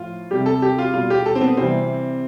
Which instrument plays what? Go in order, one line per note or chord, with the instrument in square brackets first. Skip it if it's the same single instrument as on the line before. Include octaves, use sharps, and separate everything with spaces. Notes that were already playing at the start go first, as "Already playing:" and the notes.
Already playing: [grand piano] A2 F3 F4
C3 G3 G4
A4
G4
F4
B2 G3 F4
G4
A4
C4
B3
C3 E3 G3 C4